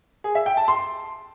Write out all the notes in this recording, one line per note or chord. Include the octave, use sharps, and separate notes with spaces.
G#4
E5
G5
A5
C6